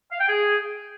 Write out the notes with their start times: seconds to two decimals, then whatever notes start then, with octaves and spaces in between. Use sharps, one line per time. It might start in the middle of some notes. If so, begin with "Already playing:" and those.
0.11 F5
0.20 G5
0.29 G#4